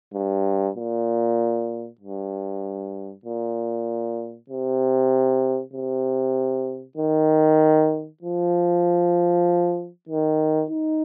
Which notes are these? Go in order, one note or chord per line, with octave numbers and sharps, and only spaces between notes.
G2
A#2
G2
A#2
C3
C3
D#3
F3
D#3
D#4